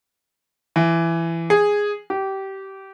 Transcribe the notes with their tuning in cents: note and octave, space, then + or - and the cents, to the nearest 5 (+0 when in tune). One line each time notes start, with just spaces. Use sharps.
E3 +15
G#4 -5
G4 -20